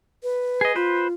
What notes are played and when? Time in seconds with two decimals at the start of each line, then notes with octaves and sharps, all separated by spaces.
0.23 B4
0.61 G#4 D#5
0.76 F4 B4 C5